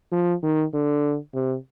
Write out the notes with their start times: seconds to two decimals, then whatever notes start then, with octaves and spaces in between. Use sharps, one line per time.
0.12 F3
0.43 D#3
0.73 D3
1.34 C3